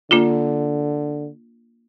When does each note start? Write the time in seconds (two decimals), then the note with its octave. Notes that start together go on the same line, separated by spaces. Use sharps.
0.11 D3 A#3 D4 F4